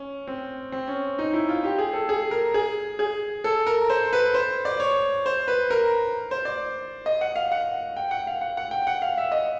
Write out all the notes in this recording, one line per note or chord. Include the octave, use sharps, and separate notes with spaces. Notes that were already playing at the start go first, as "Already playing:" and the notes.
Already playing: C#4
C4
C4
C#4
D#4
E4
F4
G4
G#4
A4
G#4
A#4
G#4
G#4
A4
A#4
C5
B4
C5
D5
C#5
C5
B4
A#4
C5
D5
D#5
F#5
F5
F#5
G5
F#5
F5
F#5
F#5
G5
F#5
F5
E5
D#5